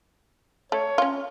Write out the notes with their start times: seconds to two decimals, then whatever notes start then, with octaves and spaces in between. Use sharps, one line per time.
0.72 A3 C#5
0.98 C#4 F4